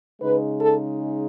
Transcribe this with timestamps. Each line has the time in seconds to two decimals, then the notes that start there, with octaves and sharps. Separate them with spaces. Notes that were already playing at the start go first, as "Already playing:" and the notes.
0.22 C#3 G#3 D#4 B4
0.60 A4